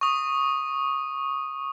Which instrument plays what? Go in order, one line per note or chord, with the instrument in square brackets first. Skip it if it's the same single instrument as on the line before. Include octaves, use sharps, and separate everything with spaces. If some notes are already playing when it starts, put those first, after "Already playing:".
[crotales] C#6 D#6